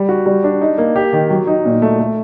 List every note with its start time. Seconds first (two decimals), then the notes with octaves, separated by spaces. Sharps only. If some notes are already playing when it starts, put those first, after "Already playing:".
Already playing: G3
0.09 F#4
0.26 G3
0.44 D4
0.61 D#4
0.78 A#3
0.96 G4
1.13 D#3
1.30 F#3
1.47 D#4
1.65 A#2
1.82 A3
2.00 A3